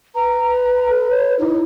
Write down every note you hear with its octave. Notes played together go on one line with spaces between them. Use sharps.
B4 A#5
A#5
A4
C#5
D#4 E4